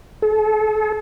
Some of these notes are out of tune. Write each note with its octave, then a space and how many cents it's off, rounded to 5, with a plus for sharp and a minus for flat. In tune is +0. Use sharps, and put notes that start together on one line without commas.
A4 -40